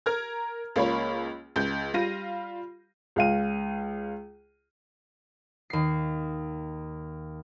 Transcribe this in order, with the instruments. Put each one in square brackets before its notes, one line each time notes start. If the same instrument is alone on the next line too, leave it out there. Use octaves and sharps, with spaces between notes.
[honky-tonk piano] A#4 A#5 F6 G#6
C#2 A#3 F4 C#5 B5
C#2 G6
G3 F4 A#6 D#7
[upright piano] C#2 F5 D#7
[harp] D#2 C7